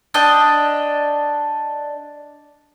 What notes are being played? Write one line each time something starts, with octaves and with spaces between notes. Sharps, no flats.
D4 D#5 G5